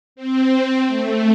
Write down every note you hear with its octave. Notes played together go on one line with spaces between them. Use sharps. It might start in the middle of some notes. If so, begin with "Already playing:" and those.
C4
A3